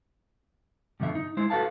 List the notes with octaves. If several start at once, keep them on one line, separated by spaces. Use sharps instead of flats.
G2 B2 D3 F3 E5
D#4
G#3 E4 C5
F#4 A4 B4 F5 A5